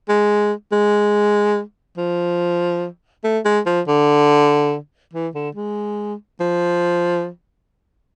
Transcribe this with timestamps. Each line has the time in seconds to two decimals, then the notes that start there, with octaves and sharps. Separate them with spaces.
0.09 G#3
0.72 G#3
1.98 F3
3.24 A3
3.45 G#3
3.66 F3
3.87 D3
5.13 E3
5.35 D3
5.55 G#3
6.40 F3